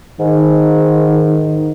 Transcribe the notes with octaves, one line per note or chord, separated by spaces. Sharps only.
G#2 D#3